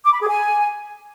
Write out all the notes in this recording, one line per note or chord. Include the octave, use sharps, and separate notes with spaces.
D6
B5
G#4
G#5